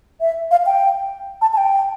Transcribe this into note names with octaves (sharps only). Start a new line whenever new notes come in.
E5
F5
G5
A5
A5
G5